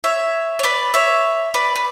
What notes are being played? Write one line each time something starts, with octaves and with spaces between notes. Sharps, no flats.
C#5 E5
C#5
B4 D5
C#5 E5
B4 D5
B4